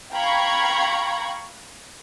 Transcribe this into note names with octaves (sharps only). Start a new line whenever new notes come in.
F5 G5 A#5 B5 C#6 G#6